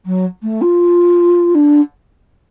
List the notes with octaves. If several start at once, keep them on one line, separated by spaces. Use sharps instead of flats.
F#3
A3
F4
D4